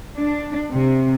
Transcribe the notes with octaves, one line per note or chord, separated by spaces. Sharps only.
D4
C3